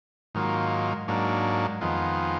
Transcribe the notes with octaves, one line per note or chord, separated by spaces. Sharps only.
G#2 D#3 F#3 A#3 F4
G#2 F#3 A#3 D4
F2 D#3 G#3 B3 F4